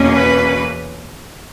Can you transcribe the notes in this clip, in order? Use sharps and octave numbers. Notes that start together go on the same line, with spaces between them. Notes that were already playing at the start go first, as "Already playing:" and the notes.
Already playing: E2 B2 A#3 C#4
B4